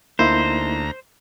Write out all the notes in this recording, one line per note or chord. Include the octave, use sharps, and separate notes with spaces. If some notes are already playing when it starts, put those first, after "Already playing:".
D2 A#3 D#4 E4 C5 A#5